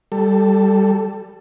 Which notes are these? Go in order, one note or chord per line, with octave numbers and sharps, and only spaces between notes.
G3 A4